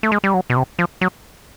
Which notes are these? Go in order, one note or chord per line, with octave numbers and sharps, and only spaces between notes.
A3
G#3
G3
F#3
B2
C3
F3
F#3